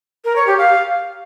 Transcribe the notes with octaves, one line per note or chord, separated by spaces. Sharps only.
A#4
C#5
G4
F5